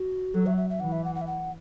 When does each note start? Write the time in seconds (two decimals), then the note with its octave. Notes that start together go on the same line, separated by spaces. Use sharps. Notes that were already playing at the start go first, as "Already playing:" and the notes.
Already playing: F#4
0.34 F#3 A4
0.46 E5
0.57 E5
0.70 E5
0.80 E3 F#5
0.92 E5
1.04 F#5
1.15 F#5
1.21 E5
1.27 F#5